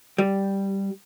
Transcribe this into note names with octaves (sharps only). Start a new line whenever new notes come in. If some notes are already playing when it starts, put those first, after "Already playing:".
G3